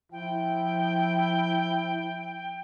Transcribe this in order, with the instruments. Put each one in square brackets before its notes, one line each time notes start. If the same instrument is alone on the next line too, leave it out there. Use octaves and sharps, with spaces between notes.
[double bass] F3 [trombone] E4 [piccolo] G5